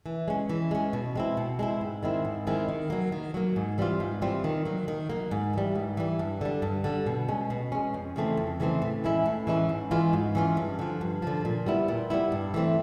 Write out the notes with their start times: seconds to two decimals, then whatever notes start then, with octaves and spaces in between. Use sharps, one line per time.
0.06 E3
0.28 G#3 C#4
0.49 E3
0.71 G#3 C#4
0.93 B2
1.15 G#3 C4 E4
1.37 B2
1.59 G#3 C4 E4
1.81 G#2
2.03 D#3 G#3 C4 E4
2.25 G#2
2.47 D#3 G#3 C4 E4
2.68 D#3
2.90 F#3 A#3
3.12 D#3
3.34 F#3 A#3
3.56 G#2
3.78 E3 G3 C4 F4
4.00 G#2
4.22 E3 G3 C4 F4
4.44 D#3
4.65 F#3 A#3
4.88 D#3
5.10 F#3 A#3
5.31 G#2
5.53 E3 G3
5.75 G#2
5.97 E3 G3
6.19 G2
6.41 D3 G3
6.62 G2
6.84 D3 G3
7.06 B2
7.28 G#3 C#4
7.50 B2
7.72 G#3 C#4
7.94 F2
8.16 C#3 E3 A3 C4
8.37 F2
8.60 C#3 E3 A3 C4
8.82 A2
9.04 E3 G#3 C#4 E4
9.26 A2
9.47 E3 G#3 C#4 E4
9.69 G#2
9.91 E3 G#3 C#4 F4
10.13 G#2
10.35 E3 G#3 C#4 F4
10.57 G2
10.79 D3 F3
11.01 G2
11.22 D3 F3
11.45 A#2
11.66 G3 B3 E4
11.88 A#2
12.10 G3 B3 E4
12.32 G2
12.54 E3 A3 C4